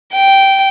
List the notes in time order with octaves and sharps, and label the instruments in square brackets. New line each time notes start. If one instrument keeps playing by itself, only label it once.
[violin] G5